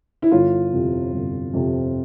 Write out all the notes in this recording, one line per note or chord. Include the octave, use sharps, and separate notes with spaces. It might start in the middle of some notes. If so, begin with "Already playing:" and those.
E4
G1 F4
F2 C3
G1
F2 C3